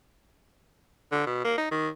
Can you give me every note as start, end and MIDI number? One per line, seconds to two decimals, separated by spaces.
1.12 1.22 50
1.26 1.42 47
1.44 1.56 58
1.58 1.67 63
1.71 1.89 51